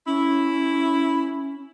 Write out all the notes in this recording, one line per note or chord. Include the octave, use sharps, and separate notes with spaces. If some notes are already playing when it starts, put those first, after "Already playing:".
C#4 E4